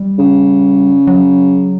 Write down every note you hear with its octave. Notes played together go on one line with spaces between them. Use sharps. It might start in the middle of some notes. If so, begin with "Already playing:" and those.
Already playing: G3
C#3
F#3